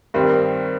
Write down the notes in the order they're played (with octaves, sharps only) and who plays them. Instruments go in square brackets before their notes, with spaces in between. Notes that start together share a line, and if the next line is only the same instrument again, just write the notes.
[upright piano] G2 D#3 G3 C4 [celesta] A#4